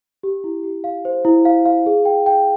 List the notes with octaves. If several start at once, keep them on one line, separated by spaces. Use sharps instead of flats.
G4
E4
G4
F5
C5
E4
F5
F5
G#4
G5
G5